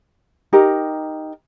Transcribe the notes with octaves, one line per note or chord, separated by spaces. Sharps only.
D#4 G4 A#4